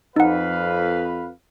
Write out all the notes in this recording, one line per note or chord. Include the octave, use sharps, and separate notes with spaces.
F2 D#4 B4 F5 F#5